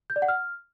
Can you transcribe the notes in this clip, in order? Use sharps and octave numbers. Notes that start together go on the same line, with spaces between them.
G6
D5
F#5
F6